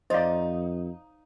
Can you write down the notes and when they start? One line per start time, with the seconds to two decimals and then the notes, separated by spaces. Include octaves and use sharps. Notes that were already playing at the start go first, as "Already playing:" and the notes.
0.10 F2 D#4 C5 D5 D#5 F5